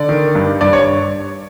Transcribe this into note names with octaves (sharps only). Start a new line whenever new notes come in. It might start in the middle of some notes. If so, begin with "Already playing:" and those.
Already playing: D3 D5
D#3
G2
G2 D5
C#5